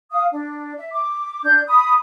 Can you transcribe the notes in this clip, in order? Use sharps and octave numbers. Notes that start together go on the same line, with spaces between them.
F5 D#6
D4
E5
D6
D4 G6
B5 D#6